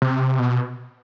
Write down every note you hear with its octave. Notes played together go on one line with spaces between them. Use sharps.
C3
B2